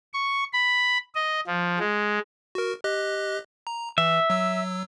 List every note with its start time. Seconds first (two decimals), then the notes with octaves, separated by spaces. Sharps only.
0.13 C#6
0.53 B5
1.15 D#5
1.47 F3
1.79 G#3
2.55 F#4 A#4
2.84 G4 D#5 F#6
3.67 A#5
3.98 E3 E5
4.30 F#3 E6